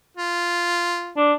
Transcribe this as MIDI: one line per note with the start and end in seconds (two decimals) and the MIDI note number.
0.17 1.17 65
1.17 1.33 62